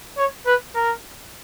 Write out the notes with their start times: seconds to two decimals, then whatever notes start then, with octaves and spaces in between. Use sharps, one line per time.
0.18 C#5
0.46 B4
0.76 A#4